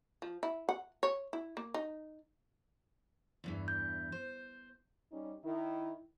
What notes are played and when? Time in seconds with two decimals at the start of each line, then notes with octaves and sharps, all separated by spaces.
0.22 F3
0.43 E4
0.69 F#5
1.03 C#5
1.33 E4
1.57 A#3
1.74 D#4
3.44 E2 G2 E3
3.68 G6
4.12 C5
5.12 G3 C#4 D#4
5.45 D#3 E4